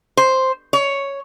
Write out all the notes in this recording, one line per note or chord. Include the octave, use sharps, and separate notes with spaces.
C5
C#5